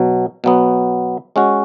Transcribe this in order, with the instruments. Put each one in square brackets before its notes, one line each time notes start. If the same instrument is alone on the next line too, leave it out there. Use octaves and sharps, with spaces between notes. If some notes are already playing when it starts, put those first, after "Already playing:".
Already playing: [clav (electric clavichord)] B2 F#3
B2 F#3 B3
G#3 C#4 F#4